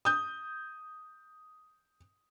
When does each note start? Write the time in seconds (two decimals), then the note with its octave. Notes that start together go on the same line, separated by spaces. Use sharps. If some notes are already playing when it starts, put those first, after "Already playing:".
0.05 D#6 G6